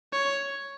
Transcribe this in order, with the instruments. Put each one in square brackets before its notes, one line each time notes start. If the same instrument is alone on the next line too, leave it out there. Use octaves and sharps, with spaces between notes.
[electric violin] C#5